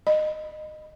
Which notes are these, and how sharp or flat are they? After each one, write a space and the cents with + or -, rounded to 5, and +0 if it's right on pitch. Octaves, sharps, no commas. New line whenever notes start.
D#5 -20